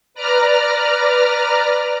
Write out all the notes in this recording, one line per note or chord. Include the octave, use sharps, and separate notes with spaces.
B4 D5 A#5 F6